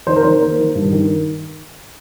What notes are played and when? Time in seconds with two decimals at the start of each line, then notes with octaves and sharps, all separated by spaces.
0.07 D#3 C5
0.16 A#4
0.23 D#3 C5
0.41 A#3
0.59 D#3
0.75 G2
0.93 D#3